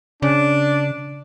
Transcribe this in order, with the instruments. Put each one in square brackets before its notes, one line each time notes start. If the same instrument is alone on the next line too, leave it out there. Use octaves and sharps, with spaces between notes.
[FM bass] C#3 [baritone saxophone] D4